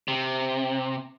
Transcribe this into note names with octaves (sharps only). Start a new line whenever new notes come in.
C3